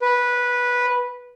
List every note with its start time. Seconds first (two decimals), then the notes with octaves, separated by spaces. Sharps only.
0.02 B4